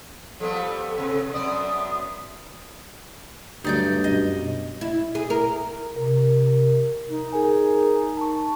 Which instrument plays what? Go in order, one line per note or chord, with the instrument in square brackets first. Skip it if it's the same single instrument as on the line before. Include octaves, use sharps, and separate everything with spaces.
[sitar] F3 G3 B3 [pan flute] A4
[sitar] C3
[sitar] F#2 B3 D5 [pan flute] D#6
[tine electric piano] D2 F#3 A3 [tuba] G2 [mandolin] D#4 D5 G6
[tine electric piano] F#2 B2 [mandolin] D#5
[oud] E4
G#4
A#4
[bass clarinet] C3 [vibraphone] A#4
[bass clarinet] D#4
[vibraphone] G#4 A#4 G#5
A5 C#6